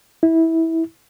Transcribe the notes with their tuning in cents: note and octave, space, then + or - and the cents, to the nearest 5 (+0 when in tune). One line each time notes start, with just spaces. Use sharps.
E4 -15